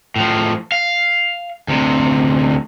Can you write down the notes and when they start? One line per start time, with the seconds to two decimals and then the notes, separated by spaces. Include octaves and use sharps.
0.16 A2 F3
0.72 F5
1.68 D2 C3